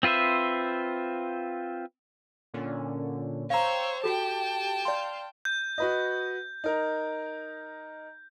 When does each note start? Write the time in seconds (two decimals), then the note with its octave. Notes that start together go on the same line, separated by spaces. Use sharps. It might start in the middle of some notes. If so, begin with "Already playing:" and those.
0.03 C4 F4 B4 C5 E5
2.54 A#2 D3 C#4
3.50 C5 C#5 F5 G5 A#5 C#6 E6
4.04 F#4 G4 A4 G5 A5
4.85 D5 F5 C6 G6
5.45 G6
5.78 F#4 B4 D#5
6.64 D#4 A#4